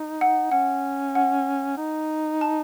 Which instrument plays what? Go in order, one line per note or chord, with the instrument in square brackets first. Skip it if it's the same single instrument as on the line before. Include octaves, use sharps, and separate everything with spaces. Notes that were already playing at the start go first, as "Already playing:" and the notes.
Already playing: [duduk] D#4
[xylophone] F#5
[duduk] C#4 [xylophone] F#5
[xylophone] F#5
[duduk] D#4
[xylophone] A5